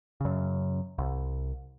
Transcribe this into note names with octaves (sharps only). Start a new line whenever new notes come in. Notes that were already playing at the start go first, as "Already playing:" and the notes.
F#2 C#3
C2